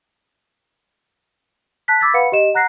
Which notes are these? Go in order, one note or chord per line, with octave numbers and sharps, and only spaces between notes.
A5 F#6 B6
B5 D6 E6 G#6 A6 B6
B4 F5 F#5 B5 C#7
G4 D#5 E7
F#5 A#5 F#6 A#6 C7